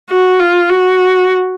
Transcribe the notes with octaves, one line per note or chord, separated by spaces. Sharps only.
F#4
F4
F#4